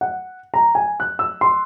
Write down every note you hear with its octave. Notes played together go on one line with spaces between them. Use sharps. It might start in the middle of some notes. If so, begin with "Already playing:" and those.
F#5
A#5
G#5
F#6
E6
C6